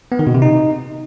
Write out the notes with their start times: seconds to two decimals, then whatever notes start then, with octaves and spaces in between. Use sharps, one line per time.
0.12 B3
0.19 D#3
0.27 B2
0.34 C3
0.42 D#4